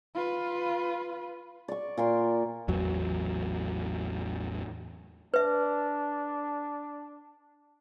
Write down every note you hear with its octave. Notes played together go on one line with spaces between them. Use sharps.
F4 B4
D5 C#6
A#2 A#4 C6
A1 E2 F#3
D4 B4 E5